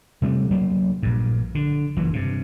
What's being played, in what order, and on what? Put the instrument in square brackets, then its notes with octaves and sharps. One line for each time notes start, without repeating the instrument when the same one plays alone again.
[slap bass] C3 G3 A3
D2 F#3 A3 A#3
A#1 G2
D3
F#1 E3 F#3
G2 C3